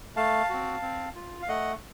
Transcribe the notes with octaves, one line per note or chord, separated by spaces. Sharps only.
A3 F5 A5
C4 F#4
C4
F4
F5
A3 D#5 F#5